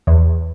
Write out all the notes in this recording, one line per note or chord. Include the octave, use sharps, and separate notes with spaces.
E2